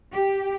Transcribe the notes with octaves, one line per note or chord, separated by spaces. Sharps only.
G4